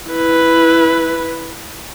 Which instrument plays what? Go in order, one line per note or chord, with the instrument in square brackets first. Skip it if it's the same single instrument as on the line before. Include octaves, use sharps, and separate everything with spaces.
[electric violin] E4 B4